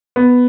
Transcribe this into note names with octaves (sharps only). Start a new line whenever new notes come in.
B3